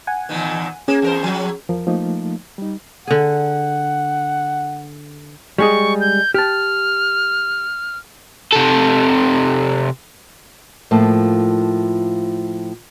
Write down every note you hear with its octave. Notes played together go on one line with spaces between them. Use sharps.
F#5 G#5
E2 A#2 D#3
A#3 C#4 G#4
E2 A#4 C5
F3 F#3
E2 F3 A#4
F3 A3 A#3 D#4
G3 D#4
D3 G#4 F#5
G3 G#3 G#4 C#6
G6
G4 A5 F6
C3 A4
A2 F3 A3 A#3 F4